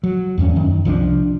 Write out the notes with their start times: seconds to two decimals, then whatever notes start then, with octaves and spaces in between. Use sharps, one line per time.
0.03 F#3
0.38 E2 G2 A3 C#4
0.56 F#2 D#3
0.85 C2 F3 G3 D4